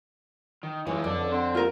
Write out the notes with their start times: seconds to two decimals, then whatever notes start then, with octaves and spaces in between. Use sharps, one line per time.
0.63 D#3
0.87 C#2 E3 G#3 C#5
1.04 F2 A4 D5
1.31 D3 C4
1.55 F4 A#4